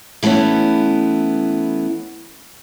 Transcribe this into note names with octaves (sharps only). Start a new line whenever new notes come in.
E3 A3 B3 C#4 E4